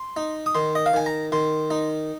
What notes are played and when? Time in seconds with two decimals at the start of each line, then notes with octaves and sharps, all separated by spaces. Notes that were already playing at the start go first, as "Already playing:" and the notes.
Already playing: C6
0.17 D#4
0.46 D#6
0.55 D#3 C6
0.75 D#5
0.86 F5
0.93 D#3 G#5
1.06 A#5
1.32 D#3 C6
1.70 D#4